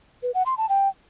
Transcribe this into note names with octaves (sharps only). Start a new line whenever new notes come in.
B4
F#5
C6
A5
G5